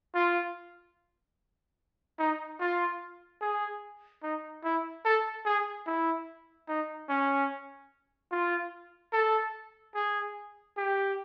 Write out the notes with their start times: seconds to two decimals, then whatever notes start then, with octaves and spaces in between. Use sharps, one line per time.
0.15 F4
2.19 D#4
2.60 F4
3.42 G#4
4.23 D#4
4.64 E4
5.05 A4
5.46 G#4
5.87 E4
6.68 D#4
7.09 C#4
8.31 F4
9.13 A4
9.95 G#4
10.77 G4